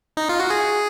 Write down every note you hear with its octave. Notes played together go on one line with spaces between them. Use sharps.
D#4
F4
F#4
G#4